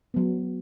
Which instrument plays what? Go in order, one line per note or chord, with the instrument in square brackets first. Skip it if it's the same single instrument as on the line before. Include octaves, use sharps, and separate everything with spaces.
[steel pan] F#3 B3